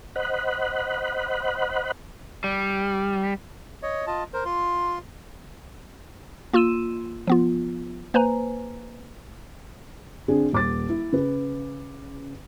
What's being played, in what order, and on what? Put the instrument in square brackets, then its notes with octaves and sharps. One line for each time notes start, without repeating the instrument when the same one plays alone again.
[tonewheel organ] C5 D#5 F#5 B5 F#6
[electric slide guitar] G3
[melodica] C#5 D#5
F4 D#5 A5
A#4 C5
F4 C6
[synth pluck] A#3 F4 C6 E6 D#7 E7
F3 B3 F4
A#3 B4 C5 G#5 A#5
[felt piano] D3 C4 D4 G#4
D#1 D6 A6
E4
C#3 B4